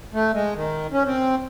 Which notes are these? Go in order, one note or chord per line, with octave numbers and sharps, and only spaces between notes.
A3
G#3
D#3
C#4
C4